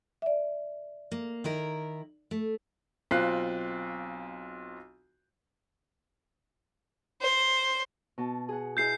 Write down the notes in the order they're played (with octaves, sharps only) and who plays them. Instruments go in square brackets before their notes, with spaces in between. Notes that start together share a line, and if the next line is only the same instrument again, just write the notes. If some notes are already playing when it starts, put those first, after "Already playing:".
[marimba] D5 E5
[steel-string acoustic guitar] A#3
D#3 E4 A#4
A3
[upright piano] B1 C4 F4 F#6 C7
[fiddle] C5
[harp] B2 A5
G#4 F#5
[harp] E4 G#4 D#5 [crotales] G6 C7